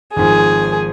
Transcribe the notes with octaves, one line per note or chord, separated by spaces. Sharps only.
G#1 G#2 F3 G#4